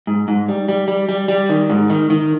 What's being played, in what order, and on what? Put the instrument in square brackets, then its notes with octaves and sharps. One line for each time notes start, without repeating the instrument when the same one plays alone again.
[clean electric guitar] G#2
G#2
G3
G3
G3
G3
G3
D#3
G#2
D#3
D#3